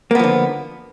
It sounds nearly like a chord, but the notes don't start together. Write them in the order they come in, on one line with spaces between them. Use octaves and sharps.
A#3 B3 F3 D3